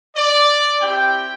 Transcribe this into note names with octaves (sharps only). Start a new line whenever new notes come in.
D5
C4 E4 G4 G5